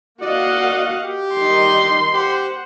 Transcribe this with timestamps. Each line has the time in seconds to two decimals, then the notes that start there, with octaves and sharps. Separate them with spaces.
0.22 A#3 F#4 D5 D#5 F5 F#5
1.04 G4
1.35 D#3 G3 D#4 C6
2.14 G4 C5 F#5